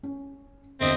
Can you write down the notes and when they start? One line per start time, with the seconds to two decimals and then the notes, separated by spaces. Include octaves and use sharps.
0.03 C#4
0.80 E1 D3 C4 C5 D#5 E5